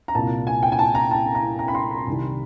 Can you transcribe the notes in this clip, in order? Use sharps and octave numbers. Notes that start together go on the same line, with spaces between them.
A#5
C2 A#2 A5
G#5
G5
G#5
A5
A#5
A5
A#5
A#5
B5
C6
B5
C2 C3 D#3